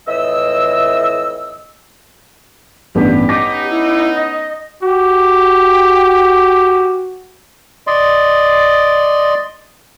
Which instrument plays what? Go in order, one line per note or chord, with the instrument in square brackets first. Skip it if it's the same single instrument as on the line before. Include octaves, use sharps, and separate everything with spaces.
[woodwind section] F2 A2 E3 D#5 E6
[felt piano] A1 G2 B3 [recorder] G4
[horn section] B3 C#4 D#4 [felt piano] D6 A#6
[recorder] E4
D#5
[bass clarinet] F#4 [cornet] G4
[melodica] D5 D#5 C6